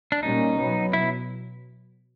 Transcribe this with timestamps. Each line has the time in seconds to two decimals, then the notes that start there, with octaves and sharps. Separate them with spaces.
0.12 D4
0.23 A#2 G3 A#3 C#4 D#4
0.58 B2 F#3 B3
0.93 E4